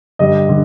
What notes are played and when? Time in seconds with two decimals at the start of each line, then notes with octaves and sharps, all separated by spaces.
0.19 G2 D3 G3 D#5
0.49 D3 G3